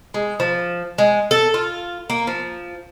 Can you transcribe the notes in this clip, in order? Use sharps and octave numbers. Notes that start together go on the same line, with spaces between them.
G#3
F3
G#3
A4
F4
A#3
F3